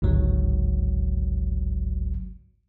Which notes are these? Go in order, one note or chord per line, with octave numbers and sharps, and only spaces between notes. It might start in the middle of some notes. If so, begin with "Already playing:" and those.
G1 C#2 G#2 F#3